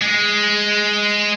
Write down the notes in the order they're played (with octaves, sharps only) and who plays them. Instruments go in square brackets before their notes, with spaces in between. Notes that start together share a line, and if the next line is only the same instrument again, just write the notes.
[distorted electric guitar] G#3